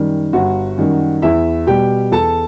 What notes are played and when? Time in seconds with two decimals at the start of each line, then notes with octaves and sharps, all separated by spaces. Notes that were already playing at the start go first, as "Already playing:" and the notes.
Already playing: F#2 D#3 G3
0.33 G1 F#4
0.78 F#2 D#3 G3
1.22 E2 E4 E5
1.67 B2 G3 G4 G5
2.12 E2 A4 A5